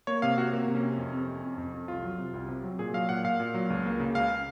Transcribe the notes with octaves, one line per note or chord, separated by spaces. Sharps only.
A#3 C#5
C3 F5
C3 F#4
A#3
C3
C#4
C3
F2
C3
F2
F2
F2
F2
C2 F4
F#3
C3
C2
C3
F#3
A#2 G#4
F#3 F5
A#2 F#5
A#2 F5
A#2
F#3
C#2
A#3
C#3
C#2 F5